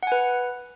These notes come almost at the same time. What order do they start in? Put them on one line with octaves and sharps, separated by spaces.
F#5 G#5 B4